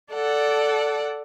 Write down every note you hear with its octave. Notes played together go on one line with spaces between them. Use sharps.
A4 D5 F#5